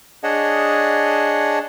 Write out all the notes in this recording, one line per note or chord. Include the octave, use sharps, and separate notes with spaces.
D4 G#4 C#5 D#5 F#5 A5